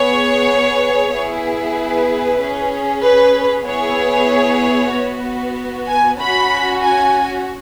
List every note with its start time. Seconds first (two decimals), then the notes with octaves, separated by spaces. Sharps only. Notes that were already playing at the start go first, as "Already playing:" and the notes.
Already playing: B3 G#4 C#5
1.11 B3 E4 G#4
1.75 B4
2.39 C#4 G#4
3.02 B4
3.65 B3 E4 G#4 C#5
4.92 B3 F#4
5.87 G#5
6.19 C#4 F#4 B5
6.82 G#5